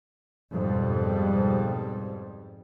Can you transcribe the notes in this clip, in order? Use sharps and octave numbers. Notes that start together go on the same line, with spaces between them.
F2 G#2 B2 G3